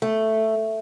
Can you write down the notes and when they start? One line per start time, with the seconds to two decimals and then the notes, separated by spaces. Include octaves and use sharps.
0.02 A3